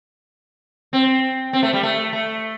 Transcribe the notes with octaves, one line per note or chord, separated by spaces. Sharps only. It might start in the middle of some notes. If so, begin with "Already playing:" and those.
C4
C4
A3
G3
A3
A3